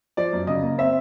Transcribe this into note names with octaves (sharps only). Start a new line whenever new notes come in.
F3 D5
F#2
C#3 D#5
A#3
C4 E5